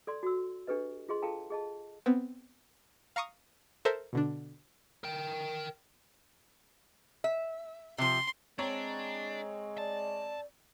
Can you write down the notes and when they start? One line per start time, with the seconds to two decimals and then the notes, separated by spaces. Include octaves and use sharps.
0.07 A4 D5 C6
0.23 F#4 E6
0.67 D4 G4 A4 B4 D#5
1.09 F4 G#4 D#5 C6
1.22 F4 A4 F5 G5 A5 A#5
1.50 G#4 D#5 A5
2.06 B3 C4
3.16 F5 A#5 C#6 D#6
3.85 A4 A#4 C5 E5
4.13 B2 D3 D4
5.04 A#4 G5
7.24 E5
7.98 C3 F3 C6
8.59 G#3 C4 D4 C#5 A#5
9.78 D5 A5